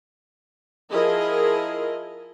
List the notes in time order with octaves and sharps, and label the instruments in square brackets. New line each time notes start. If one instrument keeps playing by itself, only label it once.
[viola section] F3 E4 G#4 A#4 D#5